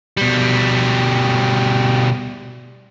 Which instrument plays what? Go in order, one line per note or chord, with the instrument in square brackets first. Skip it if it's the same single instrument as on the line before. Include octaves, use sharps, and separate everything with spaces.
[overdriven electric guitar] B2 G3